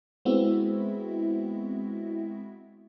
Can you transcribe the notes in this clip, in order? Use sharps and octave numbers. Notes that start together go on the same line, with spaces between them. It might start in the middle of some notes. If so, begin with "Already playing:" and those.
G#3 B3 C4 E4 F#4 E5